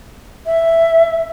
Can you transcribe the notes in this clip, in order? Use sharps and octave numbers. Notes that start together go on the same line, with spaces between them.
E5